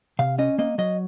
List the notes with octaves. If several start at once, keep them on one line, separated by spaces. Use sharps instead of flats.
C3 F5
C#4 D#5
A#3 D#5
F#3 D#5